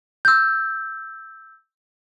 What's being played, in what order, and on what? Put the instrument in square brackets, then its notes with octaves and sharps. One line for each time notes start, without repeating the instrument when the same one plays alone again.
[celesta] E6 G6